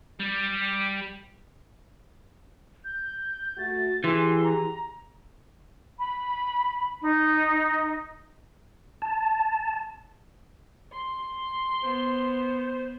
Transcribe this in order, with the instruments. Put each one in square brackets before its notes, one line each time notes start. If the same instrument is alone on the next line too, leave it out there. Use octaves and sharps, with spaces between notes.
[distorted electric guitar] G3
[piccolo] G6
[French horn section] A3 F#4 [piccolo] A6
[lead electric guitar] E3 [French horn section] G4 G#4 [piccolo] C6
[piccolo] A#5
[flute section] B5
D#4
[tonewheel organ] A5
[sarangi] C6
[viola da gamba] B3 [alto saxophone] C5